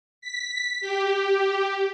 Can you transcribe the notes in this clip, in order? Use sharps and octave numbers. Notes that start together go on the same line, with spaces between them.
B6
G4